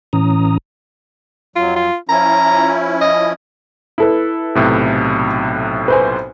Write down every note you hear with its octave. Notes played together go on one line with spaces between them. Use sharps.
A2 E3 C#4 A#5 D#6
F2 F#3 F4
F4
F3 C#4 E4 A#5
D#5
E4 A4 B4
B1 A2 C3
B4 C5 G#5